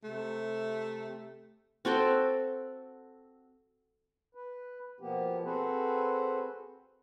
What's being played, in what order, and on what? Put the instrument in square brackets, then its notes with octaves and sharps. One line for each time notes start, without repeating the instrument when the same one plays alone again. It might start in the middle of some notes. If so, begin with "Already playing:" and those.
[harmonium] C3 [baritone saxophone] A3
[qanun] C4 F#4 A4 G5
[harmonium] B4
B2 F3 A#3 B3 G4
C4 F#4 G#4 A4 B4 C5